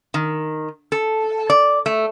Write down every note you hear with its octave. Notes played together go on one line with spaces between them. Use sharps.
D#3
A4
D5
A3